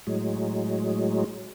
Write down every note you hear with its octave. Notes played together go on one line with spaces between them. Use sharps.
A2 F#3 G#3